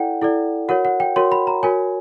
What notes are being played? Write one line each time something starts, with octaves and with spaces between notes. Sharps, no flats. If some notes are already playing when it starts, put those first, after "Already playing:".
Already playing: E4 A4 D5 F#5 G5
E4 A4 D5
F#4 A#4 C#5 F#5
F#5
G5
F#4 A#4 C#5 C6
B5
A#5
F#4 A#4 C#5 G#5